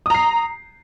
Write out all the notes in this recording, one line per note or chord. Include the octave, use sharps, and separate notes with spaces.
A#5 D#6 C7